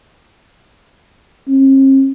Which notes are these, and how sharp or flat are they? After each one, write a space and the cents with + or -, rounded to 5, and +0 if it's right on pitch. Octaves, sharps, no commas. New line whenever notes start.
C4 +45